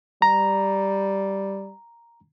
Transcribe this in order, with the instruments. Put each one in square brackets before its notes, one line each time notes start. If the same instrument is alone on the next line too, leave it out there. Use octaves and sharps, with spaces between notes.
[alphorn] G3 [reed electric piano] A#5